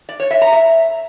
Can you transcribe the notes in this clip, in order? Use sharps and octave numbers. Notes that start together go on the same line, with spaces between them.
D5
C#5
E5
A#5
E5